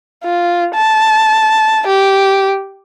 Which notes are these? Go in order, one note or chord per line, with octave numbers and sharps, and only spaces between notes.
F4
A5
G4